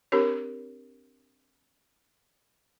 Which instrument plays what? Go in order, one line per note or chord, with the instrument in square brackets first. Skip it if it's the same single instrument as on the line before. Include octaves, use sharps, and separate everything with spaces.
[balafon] C4 D4 G4 A#4 C#5